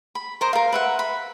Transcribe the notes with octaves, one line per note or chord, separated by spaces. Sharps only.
B5
A#4 C5 D#5
A#4 F5
B4 E5 F#5
B5